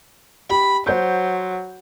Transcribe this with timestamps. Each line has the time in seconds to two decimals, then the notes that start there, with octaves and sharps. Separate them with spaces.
0.50 G4 B5
0.87 F#3 C5 G6